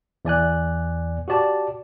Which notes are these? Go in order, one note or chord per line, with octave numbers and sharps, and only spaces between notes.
E2 D5 G#5 F#6
F#4 G4 D5 A5